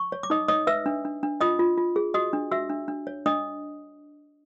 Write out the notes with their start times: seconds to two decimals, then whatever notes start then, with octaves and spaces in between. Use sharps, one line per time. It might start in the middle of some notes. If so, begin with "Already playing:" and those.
Already playing: C#6
0.12 C#5
0.23 D6
0.30 D#4 D#5 D#6
0.48 C#5 D#5 D#6
0.67 B4 E5 E6
0.86 D4
1.05 D4
1.23 D4
1.41 F4 D#5 D#6
1.59 F4
1.78 F4
1.96 G#4
2.14 F#4 D#5 D#6
2.33 D4
2.51 F#4 E5 E6
2.69 D4
2.88 D4
3.07 C#5
3.26 D4 D#5 D#6